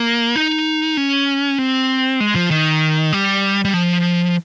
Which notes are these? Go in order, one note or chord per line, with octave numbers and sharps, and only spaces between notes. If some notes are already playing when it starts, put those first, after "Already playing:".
Already playing: A#3
D#4
C#4
C4
G#3
F3
D#3
G3
G3
F3